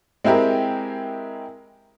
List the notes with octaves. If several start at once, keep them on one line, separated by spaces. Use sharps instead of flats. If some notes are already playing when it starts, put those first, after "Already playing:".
G#3 C4 E4 G4 A#4